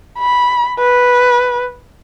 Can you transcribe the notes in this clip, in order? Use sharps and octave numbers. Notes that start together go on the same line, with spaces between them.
B5
B4